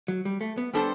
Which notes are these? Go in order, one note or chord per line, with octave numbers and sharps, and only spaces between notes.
F#3
G3
A3
B3
G3 B3 D4 A4 C5